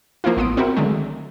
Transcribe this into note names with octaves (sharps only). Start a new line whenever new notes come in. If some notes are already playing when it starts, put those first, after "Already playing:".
F3 A#3 C4 E4 F4
A1 B3 C6 D#6 D7
C4 E4 F#4 A#4
D3 D#3 F#3 G#3 A3